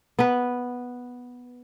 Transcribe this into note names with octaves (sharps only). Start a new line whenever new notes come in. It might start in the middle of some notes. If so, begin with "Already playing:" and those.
B3 B4